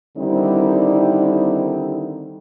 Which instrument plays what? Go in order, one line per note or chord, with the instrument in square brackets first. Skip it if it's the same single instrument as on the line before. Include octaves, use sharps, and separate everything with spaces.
[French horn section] D3 D#3 G3 C4 D#4 E4